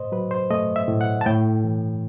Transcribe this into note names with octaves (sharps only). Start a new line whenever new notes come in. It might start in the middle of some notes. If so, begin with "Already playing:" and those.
Already playing: A2 C5 D#5
F#3 B4
C5
A3 D#5
E5
A2
F#5
A5
A2 G5
E3